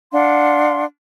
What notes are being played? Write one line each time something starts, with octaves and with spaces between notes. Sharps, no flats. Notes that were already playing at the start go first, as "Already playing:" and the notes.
D4 F5 F#5 C6